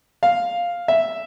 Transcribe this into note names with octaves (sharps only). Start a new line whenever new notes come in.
F5
E5